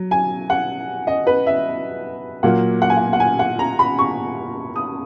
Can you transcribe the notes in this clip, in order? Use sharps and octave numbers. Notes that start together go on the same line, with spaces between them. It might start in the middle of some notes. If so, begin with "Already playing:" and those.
Already playing: F#3
G#5
F#5
D#5
B4
E5
A#2 F#3 A#3 F#5
F#5
G#5
F#5
F#5
G#5
F#5
A#5
B5
C#6
D#6